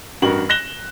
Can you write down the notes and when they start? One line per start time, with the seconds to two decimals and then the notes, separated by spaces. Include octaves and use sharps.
0.22 A1 G2 F#4 A#4 F#7
0.49 F#6 A#6 E7 G7